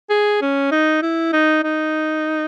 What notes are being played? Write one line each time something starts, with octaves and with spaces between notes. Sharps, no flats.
G#4
C#4
D#4
E4
D#4
D#4